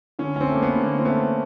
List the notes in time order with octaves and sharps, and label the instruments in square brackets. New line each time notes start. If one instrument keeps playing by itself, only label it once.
[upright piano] D3 [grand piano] C#4
[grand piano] C#4
C4
[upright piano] A3
[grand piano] A#3
B3
[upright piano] D3
[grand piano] A#3
C4
[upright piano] A3 [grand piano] B3